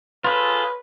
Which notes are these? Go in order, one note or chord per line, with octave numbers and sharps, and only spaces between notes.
F4 G#4 A4 B4